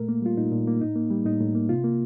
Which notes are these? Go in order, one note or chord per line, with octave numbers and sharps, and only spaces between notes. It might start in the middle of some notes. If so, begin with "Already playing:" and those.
Already playing: A#2 A3 A#4
A#3
G3 F4
A#2 D#4
A#2
A#3
A2 D#4
A#3
G3
A2 D#4
A2
A#3
C3 F4
A#3